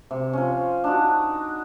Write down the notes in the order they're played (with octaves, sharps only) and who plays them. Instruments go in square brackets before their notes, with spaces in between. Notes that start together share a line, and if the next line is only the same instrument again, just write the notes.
[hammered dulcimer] C3
F3 C#4
D4 D#4 F#4